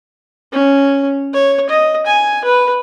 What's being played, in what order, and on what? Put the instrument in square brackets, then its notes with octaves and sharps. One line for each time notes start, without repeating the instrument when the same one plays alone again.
[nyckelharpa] C#4
C#5
D#5
G#5
B4